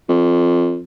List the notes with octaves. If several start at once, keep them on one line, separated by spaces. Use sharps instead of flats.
F2